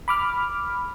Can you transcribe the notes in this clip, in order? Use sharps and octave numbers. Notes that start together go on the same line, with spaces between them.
B5 D6 F6